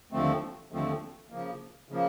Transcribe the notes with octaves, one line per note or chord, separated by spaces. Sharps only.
D#2 D3 F3 A3 C4
D#2 D3 F3 A3 C4
C#3 F3 A#3
C#3 F3 A#3